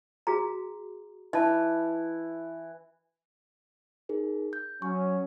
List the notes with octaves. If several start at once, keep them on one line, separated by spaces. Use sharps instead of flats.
F#4 G#4 A#5
E3 D#5 A5
D#4 G#4 A#4
G6
F#3 C#4 C#6